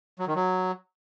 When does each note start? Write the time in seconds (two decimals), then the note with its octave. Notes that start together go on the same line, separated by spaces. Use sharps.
0.19 F#3
0.27 D#3
0.36 F#3